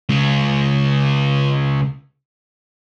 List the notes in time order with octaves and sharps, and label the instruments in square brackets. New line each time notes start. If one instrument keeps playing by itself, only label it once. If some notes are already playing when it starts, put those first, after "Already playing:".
[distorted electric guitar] C#3 G#3